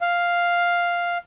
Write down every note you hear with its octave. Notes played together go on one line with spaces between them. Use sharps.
F5